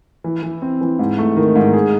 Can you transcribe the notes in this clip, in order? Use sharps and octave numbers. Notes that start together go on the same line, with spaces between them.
E3
E3
C4
E3
G#2
A3
D#3
G#2
G#4